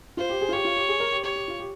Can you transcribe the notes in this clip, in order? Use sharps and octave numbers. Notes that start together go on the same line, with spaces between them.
F4 C5
G4
G#4
F4
G4 C#5
F4
G4
G#4
A#4
G4
G4 C#5
G4
F4
G4